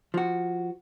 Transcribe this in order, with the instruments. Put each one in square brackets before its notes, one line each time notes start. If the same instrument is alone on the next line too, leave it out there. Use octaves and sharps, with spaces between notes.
[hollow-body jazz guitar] F3 F#4